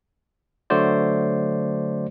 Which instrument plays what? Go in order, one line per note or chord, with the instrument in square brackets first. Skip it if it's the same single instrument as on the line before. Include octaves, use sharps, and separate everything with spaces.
[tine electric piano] D3 F#3 A3 F#4 C5 D5